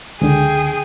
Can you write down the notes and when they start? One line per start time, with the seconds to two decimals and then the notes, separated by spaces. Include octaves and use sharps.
0.21 C#2 D3 G#4 G5